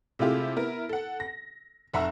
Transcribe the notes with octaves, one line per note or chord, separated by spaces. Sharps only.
C3 G#3 A3 E4 F4 G4
B3 E4 A#4
A4 F#5
A#6
F1 E5 F#5 A#5 C#6 E6